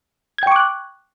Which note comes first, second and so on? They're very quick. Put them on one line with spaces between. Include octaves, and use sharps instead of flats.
G#6 G5 C#6 D6 F#6